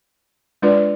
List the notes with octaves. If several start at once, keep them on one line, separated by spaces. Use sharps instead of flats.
G#3 D4 F4 B4 D5